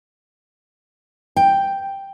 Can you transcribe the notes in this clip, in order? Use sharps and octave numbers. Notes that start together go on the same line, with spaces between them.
G5